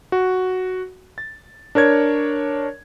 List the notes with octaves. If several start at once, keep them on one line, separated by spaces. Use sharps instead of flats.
F#4
A6
D4 A#4 C#5 G#6